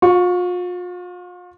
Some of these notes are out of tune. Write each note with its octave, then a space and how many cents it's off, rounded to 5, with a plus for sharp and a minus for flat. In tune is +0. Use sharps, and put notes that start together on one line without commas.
F4 +40 C#6 +0